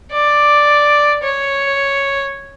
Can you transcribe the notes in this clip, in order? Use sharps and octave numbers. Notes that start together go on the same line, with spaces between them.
D5
C#5